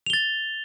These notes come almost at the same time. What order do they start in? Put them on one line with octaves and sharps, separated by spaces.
F7 G7 A6